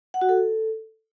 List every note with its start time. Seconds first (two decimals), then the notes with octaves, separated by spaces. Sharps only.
0.14 F#5
0.21 F#4
0.29 A4